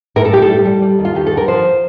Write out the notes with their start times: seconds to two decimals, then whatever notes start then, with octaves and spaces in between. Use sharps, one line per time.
0.16 A2 A#4
0.25 A4
0.33 A2 G4
0.42 A4
0.49 G3
0.65 G3
0.82 G3
0.99 D#2
1.05 F4
1.15 D#2 G4
1.26 A4
1.32 D3
1.37 A#4
1.48 F3 C5